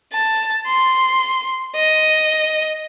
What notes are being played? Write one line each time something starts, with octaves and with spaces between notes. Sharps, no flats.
A5
C6
D#5